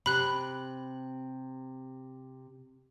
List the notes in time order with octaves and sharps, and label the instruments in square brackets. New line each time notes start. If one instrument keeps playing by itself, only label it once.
[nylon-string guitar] C3 [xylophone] B5 F#6